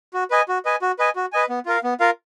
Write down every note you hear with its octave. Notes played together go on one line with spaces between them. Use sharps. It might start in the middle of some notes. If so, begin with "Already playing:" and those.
F#4
B4 D#5 G#5
F#4
B4 D#5 G#5
F#4
B4 D#5 G#5
F#4
B4 D#5 G#5
B3
F4 A#4 F5
B3
F4 A#4 F5